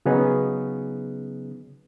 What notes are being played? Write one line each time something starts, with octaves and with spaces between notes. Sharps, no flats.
C#3 F#3 B3 C#4 D#4 G#4